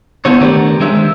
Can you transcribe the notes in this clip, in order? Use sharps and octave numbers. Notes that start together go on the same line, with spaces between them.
B3 E4 F#4 A4 C5 C#5
D#3 A3 D4 G4 A#4 D5
G#3 D4 G#4 C5 E5
D#3 E5